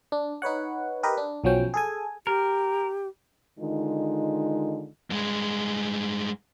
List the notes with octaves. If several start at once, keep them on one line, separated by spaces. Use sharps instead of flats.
D4
D#4 B4 C#5 F#5
G4 A#4 B4 D#5
D4
B1 F3 F#3 C#4 G5
G#4 A4 G#5
G4 A#4
D3 D#3 G#3 D#4 F4
G2 G#3